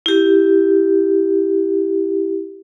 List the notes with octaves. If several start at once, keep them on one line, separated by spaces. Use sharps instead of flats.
E4 G4